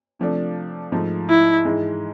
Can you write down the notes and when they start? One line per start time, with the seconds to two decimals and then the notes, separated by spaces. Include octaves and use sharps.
0.19 C3 F3 A3 D4
0.92 G#2 F3 A3
1.29 E4
1.65 G#2 E3 G#3